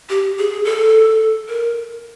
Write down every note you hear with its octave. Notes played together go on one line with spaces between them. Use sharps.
G4
G#4
A4
A#4